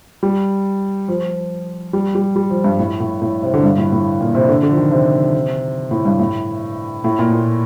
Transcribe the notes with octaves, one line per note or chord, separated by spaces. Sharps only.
G3
F3
G3
G3
G3
F3
G2
A2
A2
A2
C3
D3
G2
A2
A2
A#2
C3
D3
D3
F3
D#3
C3
A2
G2
A2
A2
A#2
A#2